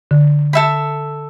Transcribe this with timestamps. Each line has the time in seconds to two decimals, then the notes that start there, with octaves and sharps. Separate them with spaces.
0.11 D3
0.53 A4 E5 B5